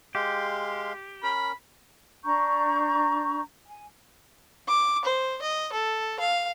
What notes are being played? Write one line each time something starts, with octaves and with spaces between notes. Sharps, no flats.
G#3 G4 F5 C6
C#4 A#4 B5
D4 A#5 C#6 G6
G#5
D6
C5
D#5
A4
F5